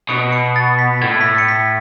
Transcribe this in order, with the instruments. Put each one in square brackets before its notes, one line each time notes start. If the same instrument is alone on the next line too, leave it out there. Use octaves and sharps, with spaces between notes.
[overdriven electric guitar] B2 [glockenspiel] C#7
[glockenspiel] C#7
A6
B6
[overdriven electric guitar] A2 [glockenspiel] G#6
[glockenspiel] B6
A6
C#7
B6